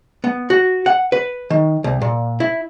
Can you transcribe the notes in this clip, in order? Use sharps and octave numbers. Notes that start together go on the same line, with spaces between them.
B3
F#4
F#5
B4
D#3
C2
A#2
E4